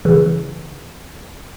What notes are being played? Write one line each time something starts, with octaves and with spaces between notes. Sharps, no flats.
C#3 E3